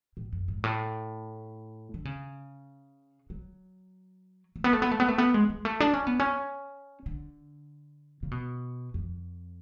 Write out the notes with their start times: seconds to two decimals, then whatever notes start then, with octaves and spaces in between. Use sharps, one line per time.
0.17 A2
0.33 F#2
0.48 G#2
0.64 A2
1.94 D3
2.05 C#3
3.30 F#3
4.56 A3
4.64 B3
4.73 A3
4.82 B3
4.92 A3
5.00 B3
5.08 A3
5.18 B3
5.34 G#3
5.49 G#3
5.65 A3
5.80 D4
5.93 C#4
6.07 B3
6.20 C#4
7.06 D3
8.23 C#3
8.31 B2
8.94 F2